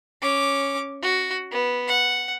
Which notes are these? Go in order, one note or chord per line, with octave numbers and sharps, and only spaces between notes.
C#4 D6
F#4
B3
F#5